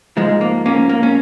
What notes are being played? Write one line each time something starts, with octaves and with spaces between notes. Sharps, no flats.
G#2 F3 G#3
A#3
A#3 C#4
A#3
C#4